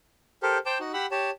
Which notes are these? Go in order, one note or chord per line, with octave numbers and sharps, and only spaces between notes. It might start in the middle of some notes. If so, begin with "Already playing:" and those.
G4 A4 A#4 C5
C5 G5 A5 D6
D#4 F#4
G4 F#5 B5 E6
G4 C#5 A5